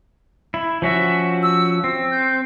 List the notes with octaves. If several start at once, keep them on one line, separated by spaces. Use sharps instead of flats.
E4
F3 C#4 F#4 E5
E6
C4 E6
G6